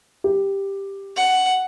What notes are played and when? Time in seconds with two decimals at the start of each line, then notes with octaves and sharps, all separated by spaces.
0.24 G4
1.17 F#5